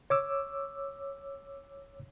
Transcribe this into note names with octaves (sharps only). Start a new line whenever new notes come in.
C#5 D6 E6